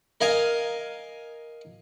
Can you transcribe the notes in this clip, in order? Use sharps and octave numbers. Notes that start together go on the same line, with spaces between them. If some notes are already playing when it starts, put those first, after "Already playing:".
A#4 D#5 F5 G#5 A#5